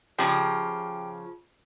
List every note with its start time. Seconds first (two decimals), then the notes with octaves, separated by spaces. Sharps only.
0.18 C#3 F3 G4 A#5